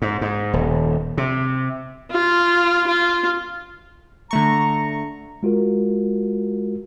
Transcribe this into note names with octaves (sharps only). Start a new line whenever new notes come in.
G#2
G#2
D#1
C3
F4
F4
D3 A3 A#5 C#6
G#3 F4 F#4 A#4